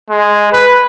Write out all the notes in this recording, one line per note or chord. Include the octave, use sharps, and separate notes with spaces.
G#3
B4